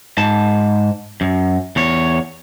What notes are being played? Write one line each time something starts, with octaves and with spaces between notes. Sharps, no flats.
G#2 A5
F#2
E2 C#5